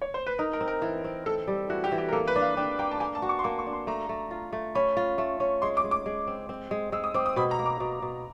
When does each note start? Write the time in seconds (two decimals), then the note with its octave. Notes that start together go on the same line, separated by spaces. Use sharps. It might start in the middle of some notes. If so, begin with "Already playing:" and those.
0.02 C#5
0.14 C5
0.26 B4
0.38 D#4 A#4
0.53 A#4
0.61 C4
0.68 A#4
0.82 E3
1.04 C4
1.26 C4 A4
1.47 G3
1.69 E3 F#4
1.84 G4
1.92 E3
1.98 G4
2.08 A#4
2.13 A#3 A4
2.27 B4
2.36 D4
2.42 F5
2.57 D4 G5
2.79 A#3 G5
2.91 A5
3.00 A#3 G#5
3.15 A5
3.22 F#4
3.29 C#6
3.39 C6
3.44 A#3 C#6
3.59 C#6
3.66 D4
3.73 C6
3.87 A3 A#5
4.09 A3
4.31 F4
4.53 A3
4.75 C#4 B5
4.97 F4
5.18 A3
5.40 C#4
5.62 G#3 C6
5.77 D6
5.84 G#3
5.91 D6
6.06 G#3
6.27 C4
6.49 C4
6.71 G#3
6.92 G#3 E6
7.04 D#6
7.14 C4 D6
7.26 D#6
7.36 B2 B5
7.51 A#5
7.59 A#3
7.66 D6
7.80 B2
8.02 B2